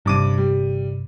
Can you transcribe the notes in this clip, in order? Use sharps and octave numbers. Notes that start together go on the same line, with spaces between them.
G1 G2 C3 D6 D#7
G3